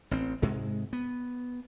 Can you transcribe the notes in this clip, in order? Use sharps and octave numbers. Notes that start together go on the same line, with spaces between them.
A1 C4
G#2 C3 G#3
B3